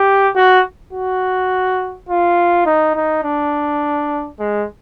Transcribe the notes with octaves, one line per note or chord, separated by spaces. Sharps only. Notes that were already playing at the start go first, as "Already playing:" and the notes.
Already playing: G4
F#4
F#4
F4
D#4
D#4
D4
G#3